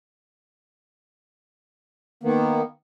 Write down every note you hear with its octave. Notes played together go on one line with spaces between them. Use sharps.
D#3 A#3 B3